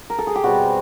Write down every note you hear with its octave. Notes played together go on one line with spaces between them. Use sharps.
A#4
A4
G#4
G4
B2 G3 C4 F#4